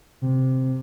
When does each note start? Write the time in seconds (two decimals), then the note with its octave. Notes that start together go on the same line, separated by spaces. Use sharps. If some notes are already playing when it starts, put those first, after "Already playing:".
0.22 C3